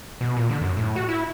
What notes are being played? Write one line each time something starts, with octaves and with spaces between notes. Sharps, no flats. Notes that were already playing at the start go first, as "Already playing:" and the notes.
B2
A#2
D3
F#2
A2
F#4
E4